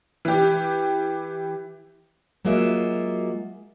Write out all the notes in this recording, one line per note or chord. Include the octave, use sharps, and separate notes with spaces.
E3 G4
F#3 G#3 A#3 F4 F#4 E5